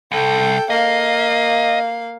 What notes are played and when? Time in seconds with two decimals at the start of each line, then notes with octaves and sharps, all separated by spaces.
0.12 C2 A4 G5
0.70 A#3 D#5 F5